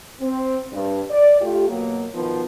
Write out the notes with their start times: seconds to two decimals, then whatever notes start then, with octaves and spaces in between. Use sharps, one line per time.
0.21 C4
0.73 G2
1.10 D5
1.41 A3 F4 G4
1.69 B2 F#3 A#3
2.15 B2 D#3 F3 B3